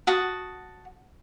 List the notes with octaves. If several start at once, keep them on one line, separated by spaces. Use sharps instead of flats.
F#4 A5 D#6